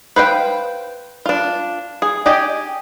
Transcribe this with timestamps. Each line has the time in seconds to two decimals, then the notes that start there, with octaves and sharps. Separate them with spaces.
0.16 B4 C5 F5 G5
1.26 D4 F4
2.02 G#4
2.26 G4 D5 D#5 G5 G#5